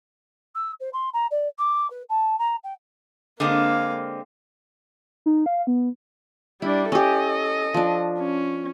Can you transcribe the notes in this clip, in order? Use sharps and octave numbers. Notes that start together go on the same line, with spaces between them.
E6
C5
C6
A#5
D5
D6
B4
A5
A#5
G5
D3 G#3 A#3 C4 F5
D#4
F5
B3
G3 D4 E4
C#4 G4 A4 D#5
F3 D4
C#4